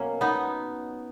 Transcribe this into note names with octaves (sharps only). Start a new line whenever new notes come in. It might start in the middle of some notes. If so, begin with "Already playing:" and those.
Already playing: B2 F#3 A#3 C#4
B3 D#4